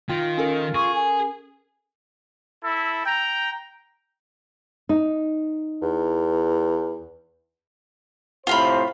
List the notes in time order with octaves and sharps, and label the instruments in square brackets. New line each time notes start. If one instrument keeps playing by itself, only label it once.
[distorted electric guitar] D#3 [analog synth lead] F4 [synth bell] G5
[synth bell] C#4 A4 A#4
[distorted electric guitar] G#4 [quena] C#6
[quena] G#5
[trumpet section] E4 A4
G5 A#5
[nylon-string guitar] D#4
[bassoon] E2
[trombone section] A2 C3 C5 [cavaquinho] F4 F5 B5